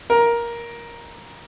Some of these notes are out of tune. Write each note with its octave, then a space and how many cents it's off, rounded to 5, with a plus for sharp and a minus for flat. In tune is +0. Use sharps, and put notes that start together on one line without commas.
A#4 +10